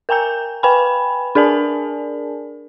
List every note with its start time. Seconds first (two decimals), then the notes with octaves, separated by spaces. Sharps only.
0.09 A#4 G5 G#5 A#5 G6
0.63 B4 G5 G#5 B5
1.35 D4 G#4 A#4 D5 G#5 A5